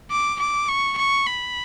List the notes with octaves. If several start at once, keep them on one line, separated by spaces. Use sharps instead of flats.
D6
D6
C#6
C#6
B5